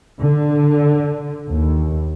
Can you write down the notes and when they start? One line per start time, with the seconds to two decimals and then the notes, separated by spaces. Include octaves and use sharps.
0.20 D3
1.50 D#2